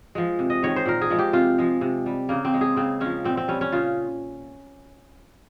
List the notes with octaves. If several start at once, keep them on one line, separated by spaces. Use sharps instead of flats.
F3 G#3
C3
D#5
D#3 G#3 C#5
C5
A#2 A#4
G#4
F3 G#3
G4
C3 F4
F3 G#3
C3
G3
C#3 A#3
C4
G#3
G#4
C#3 C4
F3 G#3 C#4
A#2 C4
C4
G3 C#4
C#4
C#3 F4